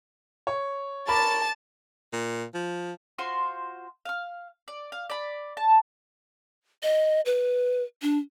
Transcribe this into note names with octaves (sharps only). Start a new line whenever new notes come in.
C#5
A#4 A5 B5 D6 A6
A#2
F3
F4 F#4 C5 C6
F5 F6
D5
F5
D5 B5
A5
D#5
B4
D4